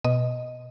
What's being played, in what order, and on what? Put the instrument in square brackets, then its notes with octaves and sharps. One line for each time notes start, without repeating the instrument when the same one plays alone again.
[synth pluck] B2 D#5